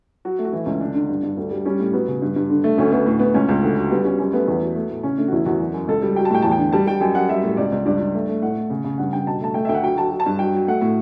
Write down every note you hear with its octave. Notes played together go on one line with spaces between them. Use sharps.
F#3 F#4
A3
F#4
E3 E4
C#2 C#4
D3 D4
D3
G2
G2
D2
G3
G3 C#4
A2
F#3 B3
C#3
G2
G2
D3
A3
D2 C#4
D2 B3
A2
A2 B3
C#2 C#4
C#2
D2
F#3
G3 B3
G3 C#4
F#2 C#4
A3 B3
E2
F#3
A3
A2
C#3 C#4
A3 D4
F#4
E2 E4
E2 F#4
F#2
F#2
C#2 A4
G3
F#3 G5
A5
A2 G5
E2 A5
G5
D3
G3 A5
G3 G5
F#2 G5
F#2 F#5
G3 E5
A2
C#2 D5
C#2
G2 D5
G2
A3
A3
A2 F#5
A2
C#3
C#3
G2 F#5
G2 G5
B2 A5
A3 A5
A3 G5
D2 E5 G5
F#5
F#3 G5
F#3 A5
F#3
A5
G2
F#3 G5
F#3
A3 F#5
A2